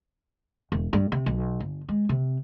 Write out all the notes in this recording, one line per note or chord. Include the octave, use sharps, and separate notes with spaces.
E1
G2
C3
B1
G1
G#3
C3